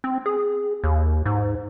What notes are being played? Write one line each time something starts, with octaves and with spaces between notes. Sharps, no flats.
C4
G#4
D#2
G#2